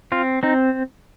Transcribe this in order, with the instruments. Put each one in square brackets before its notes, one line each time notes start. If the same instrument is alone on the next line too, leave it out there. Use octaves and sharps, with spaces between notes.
[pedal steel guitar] C4 F4
C4 D#4